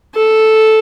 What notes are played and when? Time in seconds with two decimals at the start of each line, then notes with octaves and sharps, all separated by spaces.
0.15 A4